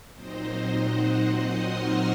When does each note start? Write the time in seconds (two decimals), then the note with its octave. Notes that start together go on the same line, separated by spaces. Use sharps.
0.14 A#2 F#3 C4 D#4 C5 D#5
0.76 D#5 F#5
1.38 C6 D#6
1.70 C#6 F6